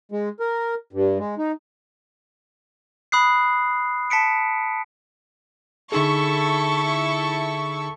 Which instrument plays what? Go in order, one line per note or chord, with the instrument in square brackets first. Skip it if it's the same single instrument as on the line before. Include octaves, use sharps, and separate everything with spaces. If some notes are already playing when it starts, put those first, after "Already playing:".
[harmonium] G#3
A#4
G2
G#3
D#4
[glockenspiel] B5 D#6 F#6 C7
A5 B6 C#7 D7
[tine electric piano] D3 D#4 G#4 [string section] E4 A4 C#6